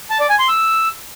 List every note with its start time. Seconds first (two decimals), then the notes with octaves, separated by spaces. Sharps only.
0.10 A5
0.20 D5
0.29 G#5
0.39 C6
0.49 E6